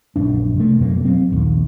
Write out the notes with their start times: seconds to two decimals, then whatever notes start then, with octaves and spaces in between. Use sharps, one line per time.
0.16 A#1 F#2 D4
0.56 C3 A3
0.79 F2 B2 F#3 A#3
1.05 F#3 C4
1.30 A#1 D#2